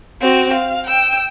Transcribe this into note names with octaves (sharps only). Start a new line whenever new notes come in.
C4 F#4
F5
G5 E6